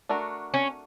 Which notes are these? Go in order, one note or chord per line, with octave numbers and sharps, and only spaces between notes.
A3 D4 F#4 A#4
C#4